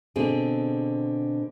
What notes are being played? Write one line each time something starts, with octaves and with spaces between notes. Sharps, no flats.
B2 D3 C4 G#4